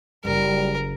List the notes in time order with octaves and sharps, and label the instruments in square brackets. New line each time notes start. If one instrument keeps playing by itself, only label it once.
[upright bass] F#1 [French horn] G3 [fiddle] A#4